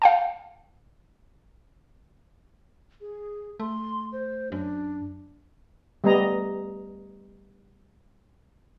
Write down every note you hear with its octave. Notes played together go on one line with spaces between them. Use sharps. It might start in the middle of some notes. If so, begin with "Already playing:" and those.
F5 G5 A5
G#4
A3 C6
C5
F#2 D4
G3 A3 B3 D#5 A#5